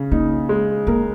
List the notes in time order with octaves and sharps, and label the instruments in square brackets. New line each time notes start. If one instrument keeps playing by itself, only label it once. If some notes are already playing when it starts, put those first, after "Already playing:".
Already playing: [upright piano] C#3
[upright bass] A#3 [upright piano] D#4
[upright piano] G#3
[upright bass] A#3 [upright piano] A#4